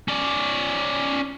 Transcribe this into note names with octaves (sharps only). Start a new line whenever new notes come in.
C#4 D5